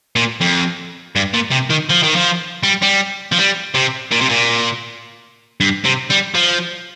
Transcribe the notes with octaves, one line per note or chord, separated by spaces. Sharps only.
A#2
F2
G2
A#2
C3
D#3
F3
D#3
F3
G3
G3
F3
G3
C3
A#2
C3
A#2
G2
C3
G3
F3